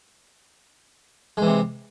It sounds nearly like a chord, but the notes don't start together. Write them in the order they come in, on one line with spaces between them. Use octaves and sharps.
G#3 E3 C3